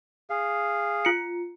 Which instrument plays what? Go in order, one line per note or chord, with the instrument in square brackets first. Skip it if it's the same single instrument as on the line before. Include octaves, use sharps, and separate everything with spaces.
[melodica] G#4 F5
[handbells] F4 C#7